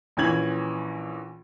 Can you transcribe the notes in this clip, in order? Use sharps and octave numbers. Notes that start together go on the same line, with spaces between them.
A#1 E3 C#4 G#6 F#7